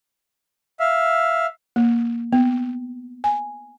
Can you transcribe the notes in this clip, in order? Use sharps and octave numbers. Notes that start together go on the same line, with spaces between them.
E5 F5
A#3
B3
G#5